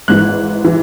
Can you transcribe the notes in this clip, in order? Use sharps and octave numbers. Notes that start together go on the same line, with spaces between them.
G#1 G#2 E3 F#6
E3